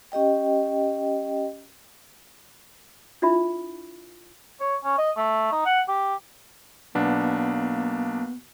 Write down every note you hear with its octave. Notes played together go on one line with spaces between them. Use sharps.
C#4 G4 D#5 G5
D4 E4 F4 E5 B5
C#5
C#4
D#5
A3
D#4
F#5
G4
B1 A#3 B3 D4